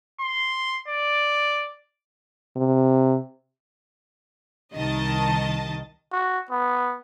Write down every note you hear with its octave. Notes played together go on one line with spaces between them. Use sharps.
C6
D5
C3
C2 D#3 D#5 A5
F#4
B3